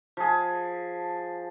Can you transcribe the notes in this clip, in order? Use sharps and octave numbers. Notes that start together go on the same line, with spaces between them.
F3 G#4